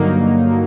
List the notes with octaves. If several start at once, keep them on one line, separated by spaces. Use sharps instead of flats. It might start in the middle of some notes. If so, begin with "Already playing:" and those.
Already playing: G2 D3 F#3 A#3 D#4